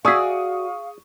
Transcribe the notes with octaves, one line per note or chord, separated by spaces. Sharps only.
F#4 G#4 D5 E5 F5 C#6 D#6